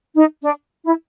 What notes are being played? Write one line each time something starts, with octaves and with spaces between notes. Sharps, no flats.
D#4
D4
E4